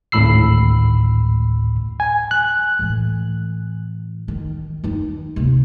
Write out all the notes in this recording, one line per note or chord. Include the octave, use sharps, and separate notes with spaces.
G#1 D2 A2 B5 E6 C7
G#5
F#6
A2 E3
D#3
D#3 D#4
D#2 C3